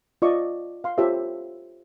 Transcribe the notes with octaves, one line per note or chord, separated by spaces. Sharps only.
F4 D5 D#5 C#6
F5 C6
F4 G4 A4 C5 C#5 E5